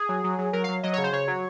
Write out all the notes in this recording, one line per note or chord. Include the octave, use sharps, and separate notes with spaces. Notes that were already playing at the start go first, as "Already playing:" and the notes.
Already playing: G#4
F#3
F#3
F#3
F#3 A#4
F5
F#3
F#3 D#5
C#5
C#3
C5
C#3 C#5
F#3